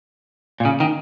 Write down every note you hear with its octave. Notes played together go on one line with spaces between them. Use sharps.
A#2
C#3
D#3